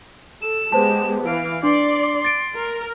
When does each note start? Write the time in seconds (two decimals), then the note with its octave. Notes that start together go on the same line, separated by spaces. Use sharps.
0.42 A4 E7
0.72 G#3 B3 G4 B4 C5 A5
1.26 E3 F5 D7
1.63 D4 D5 C6
2.24 A6 D7
2.56 A#4